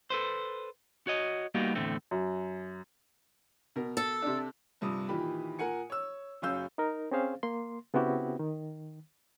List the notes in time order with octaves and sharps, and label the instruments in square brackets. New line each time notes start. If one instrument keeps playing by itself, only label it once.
[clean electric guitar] A4 B4 C5
F#4 C#5 D#5
G3 A#3 B3 D#4 F#4 G4
E2 A2 D3 A3 C4
[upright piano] F#2
[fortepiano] B2 A#4
[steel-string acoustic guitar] A4
[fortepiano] C3 D4
[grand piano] A#1 G2 C3 D#6
A#2 D#3 E3 G4 B5
A#2 A#4 F#5 G#5 C#7
C#5 E6
F#1 F#3 C#4 F5 E6 G6
[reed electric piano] D#4 A#4
C4 C#4 G#4 C5 F5
A#3 C6
C#3 B3 C4 E4 F#4 G4
D#3